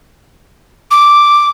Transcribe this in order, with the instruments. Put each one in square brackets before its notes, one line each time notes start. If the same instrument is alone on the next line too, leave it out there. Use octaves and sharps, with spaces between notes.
[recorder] D6